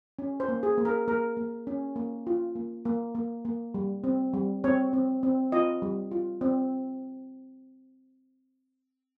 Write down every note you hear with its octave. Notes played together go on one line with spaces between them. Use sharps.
C#4
C5
A#3
G#4
A#3
A#4
A#3 A#4
A#3
C#4
A#3
F4
A#3
A#3
A#3
A#3
G3
C4
G3
C4 C#5
C4
C4
F4 D#5
G3
F4
C4